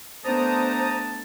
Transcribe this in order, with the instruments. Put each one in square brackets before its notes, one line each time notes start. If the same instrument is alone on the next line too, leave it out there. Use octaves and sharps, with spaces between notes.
[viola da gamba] A3 B3 D4 [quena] C5 [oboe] A5 [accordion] A#5 D#6